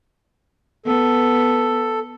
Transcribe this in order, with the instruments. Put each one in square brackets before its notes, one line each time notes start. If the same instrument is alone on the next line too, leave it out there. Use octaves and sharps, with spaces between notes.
[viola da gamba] B3 [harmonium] A4